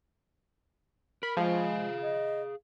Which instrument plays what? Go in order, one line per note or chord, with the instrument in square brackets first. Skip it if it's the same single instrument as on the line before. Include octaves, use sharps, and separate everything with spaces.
[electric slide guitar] A#4 [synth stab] B5
[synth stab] F3 [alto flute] G#3 [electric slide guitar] G#4 F5
[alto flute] D#5